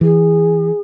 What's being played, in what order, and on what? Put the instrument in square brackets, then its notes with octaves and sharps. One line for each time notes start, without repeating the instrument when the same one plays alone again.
[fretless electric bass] E3 [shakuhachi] G#4